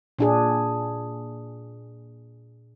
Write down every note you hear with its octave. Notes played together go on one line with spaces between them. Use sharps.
A#2 D4 G#4